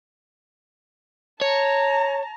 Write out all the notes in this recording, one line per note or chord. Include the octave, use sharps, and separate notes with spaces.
C#5 A5 A#5